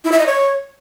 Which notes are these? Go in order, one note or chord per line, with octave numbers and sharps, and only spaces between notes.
E4
E5
D#5
C#5